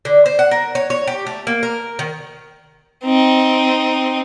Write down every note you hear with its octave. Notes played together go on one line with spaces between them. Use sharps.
D3
C5
F#5
A#4
C#5
C#5
G4
A3
A#3
A#4
D#3
C4 D#4